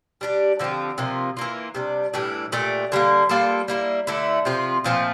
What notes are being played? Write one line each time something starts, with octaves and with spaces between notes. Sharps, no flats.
G3 D4 G4
D3 F3 C4 G4
C3 F3 A#3 F4
E3 A#3 F4
C3 G3 D4
A2 E3 G3 D4
A#2 A3 D4 G4
D3 G3 A#3
G3 A#3 F4 A4
G3 A#3 E4
D3 A3 E4
C3 F3 C4 F4
A#2 F3 A3 C4